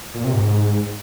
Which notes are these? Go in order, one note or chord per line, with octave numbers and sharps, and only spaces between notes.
A#2
C3
G#2